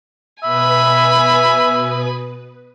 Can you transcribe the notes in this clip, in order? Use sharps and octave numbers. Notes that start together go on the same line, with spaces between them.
B2 B4 E5 G#5 B5 D#6